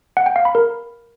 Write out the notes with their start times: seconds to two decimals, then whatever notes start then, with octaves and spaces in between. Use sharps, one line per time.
0.17 F#5
0.26 G5
0.36 F5
0.45 B5
0.55 A#4